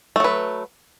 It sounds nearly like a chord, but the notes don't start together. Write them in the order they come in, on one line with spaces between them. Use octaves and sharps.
A3 F#3 B4